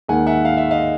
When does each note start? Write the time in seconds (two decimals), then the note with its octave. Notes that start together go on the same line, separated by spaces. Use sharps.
0.08 D#2 D#3 G#3 F#5 G#5
0.27 E5 F#5
0.45 F5
0.57 E5
0.71 D#5 F5